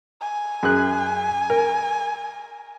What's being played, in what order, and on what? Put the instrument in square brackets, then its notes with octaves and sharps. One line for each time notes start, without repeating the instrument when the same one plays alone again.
[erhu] G#5
[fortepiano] F#2 G#4 F#6
A#4